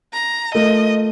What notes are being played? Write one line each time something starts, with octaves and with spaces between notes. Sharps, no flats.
A#5
A3 F4 A4 A#4 D#5